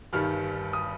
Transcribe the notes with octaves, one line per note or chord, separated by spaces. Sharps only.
G1 G2 D#3 G3 F6
D#6